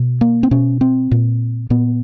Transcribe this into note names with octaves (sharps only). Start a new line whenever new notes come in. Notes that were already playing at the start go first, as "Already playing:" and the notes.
Already playing: B2
A#3
C4
B2 C#4
C4
A#2
A#2 B3